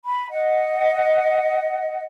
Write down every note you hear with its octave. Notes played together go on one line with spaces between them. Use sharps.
B5
D#5 F#5